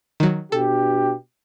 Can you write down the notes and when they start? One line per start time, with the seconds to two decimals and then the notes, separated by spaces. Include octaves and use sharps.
0.20 D#3 F#3
0.52 B2 D4 G4 A4